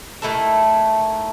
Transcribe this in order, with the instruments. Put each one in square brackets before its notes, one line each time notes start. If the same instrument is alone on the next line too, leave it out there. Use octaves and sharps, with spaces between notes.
[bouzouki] D#3 A3 E4 A4